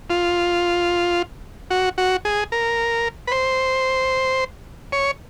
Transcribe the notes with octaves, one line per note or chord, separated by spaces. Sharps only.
F4
F#4
F#4
G#4
A#4
B4
C5
C#5